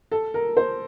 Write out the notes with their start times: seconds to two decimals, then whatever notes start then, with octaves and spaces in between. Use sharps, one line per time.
0.11 A4
0.34 A#4
0.57 C5